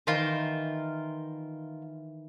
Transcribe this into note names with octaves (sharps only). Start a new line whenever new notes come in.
D#3 E3 F4 A#4 C5